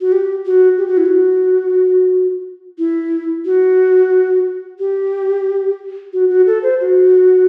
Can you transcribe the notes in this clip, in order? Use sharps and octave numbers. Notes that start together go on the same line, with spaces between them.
F#4
G4
F#4
G4
F#4
E4
F#4
E4
F#4
G4
F#4
F#4
A4
C5
F#4